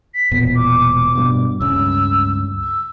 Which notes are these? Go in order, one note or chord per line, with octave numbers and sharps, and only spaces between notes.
B6
E1 A#2 B3
D6
G2 B2
C#2 G2 C#3 E6
E6